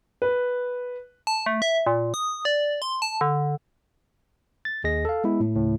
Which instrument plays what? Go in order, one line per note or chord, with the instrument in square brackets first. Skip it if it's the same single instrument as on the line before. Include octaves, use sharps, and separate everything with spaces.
[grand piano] B4
[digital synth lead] A5
A3
E5
A#2
D#6
D5
C6
A5
D3
[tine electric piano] A6
D#2 G#4 D#5 A#6
A4 F5
G#3 B3 E4
A2
D2 A2 C#3